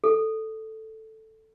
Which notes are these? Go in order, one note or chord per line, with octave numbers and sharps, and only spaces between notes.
A4